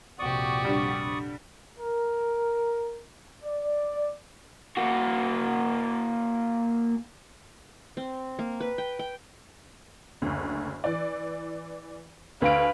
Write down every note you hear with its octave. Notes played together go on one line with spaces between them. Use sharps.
A#1 F2 C3 F#4 G4 D5 C#6 D#6
D3 G3
A#4
D5
A#3 F#4
C4
A#3
B4
G5
G5
F#1 D2
E3 D5
D2 B4 F5 D7